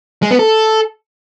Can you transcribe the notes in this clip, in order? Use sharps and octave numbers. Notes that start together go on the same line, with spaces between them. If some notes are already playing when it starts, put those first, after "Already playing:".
G#3
B3
A4